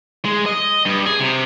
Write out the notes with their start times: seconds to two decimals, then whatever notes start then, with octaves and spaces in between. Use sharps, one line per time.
0.25 G#3
0.46 D#5
0.86 G2
1.06 G#4
1.20 C3